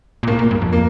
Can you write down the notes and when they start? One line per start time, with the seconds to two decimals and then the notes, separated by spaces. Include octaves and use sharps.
0.23 A#2
0.27 A2 A#3
0.39 A#2
0.51 G2
0.62 F2
0.73 A#3